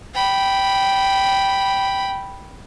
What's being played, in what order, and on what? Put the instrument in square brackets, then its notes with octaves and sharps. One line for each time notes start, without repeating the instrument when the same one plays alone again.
[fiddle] G5 B5